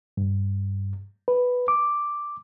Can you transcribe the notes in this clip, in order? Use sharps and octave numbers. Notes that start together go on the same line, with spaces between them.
G2
B4
D6